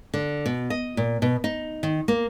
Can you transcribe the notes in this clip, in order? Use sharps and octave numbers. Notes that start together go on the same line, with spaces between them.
D3
B2
D#5
A#2
B2
D#4
D#3
A#3